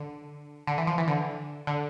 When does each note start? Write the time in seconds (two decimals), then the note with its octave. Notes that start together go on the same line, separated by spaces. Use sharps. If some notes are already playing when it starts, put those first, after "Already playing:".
Already playing: D3
0.67 D3
0.78 E3
0.87 F3
0.98 E3
1.07 D3
1.67 D3